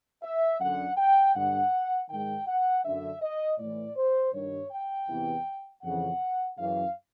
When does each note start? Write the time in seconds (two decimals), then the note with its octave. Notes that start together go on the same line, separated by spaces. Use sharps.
0.23 E5
0.60 F#2 D3 F#5
0.97 G5
1.35 G2 D3 F#5
2.10 G#2 D#3 G5
2.47 F#5
2.85 F#2 D3 E5
3.22 D#5
3.59 A2 E3 D5
3.96 C5
4.34 G2 D#3 C#5
4.71 G5
5.09 E2 C3 E3
5.83 F2 C#3 E3 F#5
6.58 F#2 C#3 E3 F5